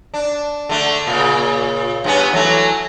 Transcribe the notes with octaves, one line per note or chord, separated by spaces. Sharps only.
D4
D3 A3
A#2 C#3
G2 B3 C#4
E3 F#3 A3